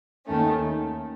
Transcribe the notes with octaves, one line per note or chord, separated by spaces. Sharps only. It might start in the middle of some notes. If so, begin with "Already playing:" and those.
D#2 D#3 A3 C#4